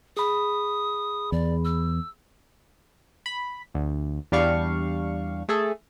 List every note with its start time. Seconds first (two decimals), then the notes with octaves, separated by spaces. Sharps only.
0.17 G#4 B5 D#6
1.32 E2 D5
1.65 E6
3.26 B5
3.74 D2
4.32 E2 G3 D4 F5 C#6
5.48 A3 G#4 A4